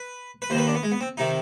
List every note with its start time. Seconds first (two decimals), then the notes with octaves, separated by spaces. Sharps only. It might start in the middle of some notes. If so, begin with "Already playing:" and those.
Already playing: B4
0.42 B4
0.50 D#2 C5
0.55 D#3 B4
0.67 D4
0.75 B3
0.83 G#3
0.92 B3
1.01 C4
1.17 C3 D#3 D#4